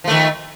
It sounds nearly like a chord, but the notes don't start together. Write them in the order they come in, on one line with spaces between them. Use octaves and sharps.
F3 A3 D#3